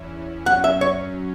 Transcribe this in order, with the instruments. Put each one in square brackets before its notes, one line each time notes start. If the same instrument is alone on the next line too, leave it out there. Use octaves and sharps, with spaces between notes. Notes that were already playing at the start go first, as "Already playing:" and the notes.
Already playing: [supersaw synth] E2 E3 C#4 E4
[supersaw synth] F#2 F#3 C#4 [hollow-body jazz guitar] F#5
[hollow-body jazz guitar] E5
C#5